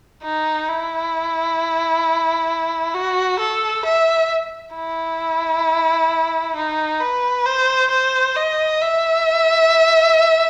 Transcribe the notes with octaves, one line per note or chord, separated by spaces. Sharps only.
D#4
E4
F#4
A4
E5
E4
D#4
B4
C5
C5
D#5
E5